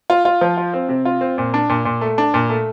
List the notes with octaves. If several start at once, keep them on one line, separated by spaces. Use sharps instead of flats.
F4
F4
F3
F4
C4
C3
F4
C4
A#2
D4
A#2
A#2
A3
D4
A#2
A3